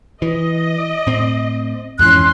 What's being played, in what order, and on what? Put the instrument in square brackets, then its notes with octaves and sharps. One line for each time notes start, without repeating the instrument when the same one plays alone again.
[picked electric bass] E3 [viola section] D#5
[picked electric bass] A2 C4
[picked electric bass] F2 G#2 E3 [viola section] C#4 C6 [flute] F#6